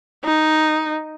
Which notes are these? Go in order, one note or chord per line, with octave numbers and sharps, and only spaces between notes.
D#4